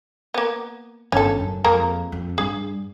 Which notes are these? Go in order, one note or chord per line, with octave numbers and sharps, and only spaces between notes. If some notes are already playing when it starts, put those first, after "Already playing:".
A#3 B3
G1 D#3 C#4 A4
F#2
F2 G#3 A#3 A#5
F2
G2 G#4